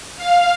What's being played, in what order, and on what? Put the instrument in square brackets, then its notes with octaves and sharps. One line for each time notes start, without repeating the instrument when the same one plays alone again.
[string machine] F5